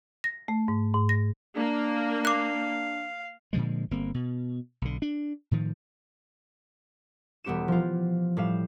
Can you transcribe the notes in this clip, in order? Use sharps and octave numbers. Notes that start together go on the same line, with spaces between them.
A#6
A3
G#2
G#2
A#6
A#3 D4
F5 D6 F#6
A#2 D3 F3 G#3
G1 A#3 C4
B2
B1 D3
D4
A2 D#3 F3
E1 G3 B3 G4 C#7 E7
F3 F4
A2 G3 F5 E7